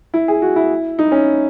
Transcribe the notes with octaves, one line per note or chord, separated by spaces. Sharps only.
E4
G#4
F#4
E4
D#4
C#4